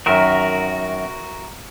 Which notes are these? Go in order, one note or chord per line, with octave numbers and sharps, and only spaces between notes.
F#2 D#3 F#4 A#4 E5